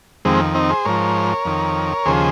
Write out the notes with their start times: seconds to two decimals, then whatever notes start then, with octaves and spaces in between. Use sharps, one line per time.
0.25 F2 D#3 G#3 C4
0.55 C4 D#4
0.70 G#4 C5
0.85 G#2 F3 A#4 C#5
1.45 F2 D#3
2.06 D#2 C#3 F3 G#4 C5